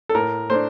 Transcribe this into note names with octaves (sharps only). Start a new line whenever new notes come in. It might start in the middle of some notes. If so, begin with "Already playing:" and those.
A4
A2 A#4
A3 D4 C5